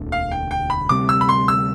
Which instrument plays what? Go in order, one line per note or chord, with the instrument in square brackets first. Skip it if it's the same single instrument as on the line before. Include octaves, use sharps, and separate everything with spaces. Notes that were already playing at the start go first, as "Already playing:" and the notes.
Already playing: [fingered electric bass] E1 D2 D3
[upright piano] F5
G5
G5
B5
[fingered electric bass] D2 C3 G3 C4 [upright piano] D6
[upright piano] E6
B5
C6
E6